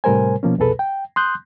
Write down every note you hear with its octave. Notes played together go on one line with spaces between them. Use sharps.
A2 C3 G3 A#4 C5 G#5
B2 F3 A#3 C#4
C2 F2 B2 G#4 A4 B4
G5
C6 D#6 F#6 G6